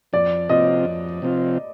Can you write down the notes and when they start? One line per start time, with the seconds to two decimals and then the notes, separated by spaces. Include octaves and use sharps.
0.13 F2 D5
0.49 C3 F3 C4 F4 D#5
0.85 F2
1.22 C3 F3 C4 F4